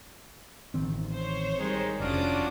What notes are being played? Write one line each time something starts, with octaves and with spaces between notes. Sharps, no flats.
A1 D#3 C4
C5 C#5
D#3 G3 G#3 D#4
F1 C#4 D4 F4 F#4 D6 D#6